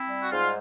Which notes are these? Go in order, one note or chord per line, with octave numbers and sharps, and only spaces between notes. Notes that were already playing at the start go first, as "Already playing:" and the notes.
Already playing: C4 E4
G3
F#4
G#2 F4